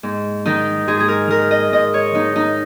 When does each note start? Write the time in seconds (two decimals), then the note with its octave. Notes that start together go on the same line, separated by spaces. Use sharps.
0.03 G#2
0.46 D#3 D#4
0.88 G#2 G#4
1.00 G#4
1.08 A#4
1.30 D#3 A#4
1.51 D#5
1.72 G#2 D#5
1.94 C#5
2.14 D#3 D#4
2.36 D#4